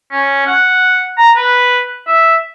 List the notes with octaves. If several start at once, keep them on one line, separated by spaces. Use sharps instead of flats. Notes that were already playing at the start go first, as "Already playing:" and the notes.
C#4
F#5
A#5
B4
E5